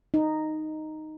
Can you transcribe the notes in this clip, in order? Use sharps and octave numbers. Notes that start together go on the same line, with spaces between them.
D#4